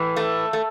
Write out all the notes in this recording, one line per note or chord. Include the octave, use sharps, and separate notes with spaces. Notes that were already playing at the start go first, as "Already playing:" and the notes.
Already playing: A2 E3
A3
A3